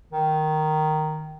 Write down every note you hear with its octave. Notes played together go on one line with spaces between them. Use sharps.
D#3